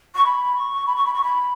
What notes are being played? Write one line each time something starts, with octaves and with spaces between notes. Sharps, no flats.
C#6
B5
C#6
B5
C#6
B5
C#6
B5